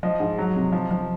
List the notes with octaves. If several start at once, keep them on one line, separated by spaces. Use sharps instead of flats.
F3 D#5
G#2
F#3
C3
F3
F3